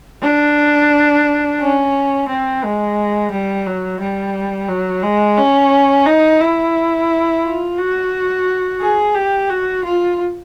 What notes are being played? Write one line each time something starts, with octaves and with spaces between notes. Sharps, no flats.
D4
C#4
C4
G#3
G3
F#3
G3
F#3
G#3
C#4
D#4
E4
F4
F#4
G#4
G4
F#4
F4